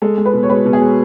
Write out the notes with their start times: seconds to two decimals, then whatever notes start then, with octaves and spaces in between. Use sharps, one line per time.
0.02 G#3 A4
0.18 G#3
0.25 B4
0.33 B2
0.43 C#5
0.49 G#3 B4
0.66 B2
0.73 G#4
0.82 G#3